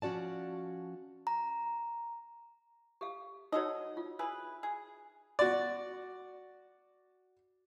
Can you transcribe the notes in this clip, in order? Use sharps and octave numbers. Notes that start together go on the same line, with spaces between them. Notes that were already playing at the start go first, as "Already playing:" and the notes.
F3 C#4 F#4 D5 A5
A#5
G4 A4 F5
F#3 D#4 F#4 A4 C#5 D#5
F4
E4 G#4 B4
G#4
F#4 D5